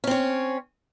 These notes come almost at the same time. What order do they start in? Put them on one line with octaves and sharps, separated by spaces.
C#4 C4 C#5